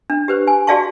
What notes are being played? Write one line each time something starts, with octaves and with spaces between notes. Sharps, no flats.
D4
G4 B4 C5
G#5
F#4 G#4 D5 F5 A5 C#6